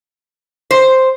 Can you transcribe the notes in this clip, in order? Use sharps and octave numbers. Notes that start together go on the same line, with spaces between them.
C5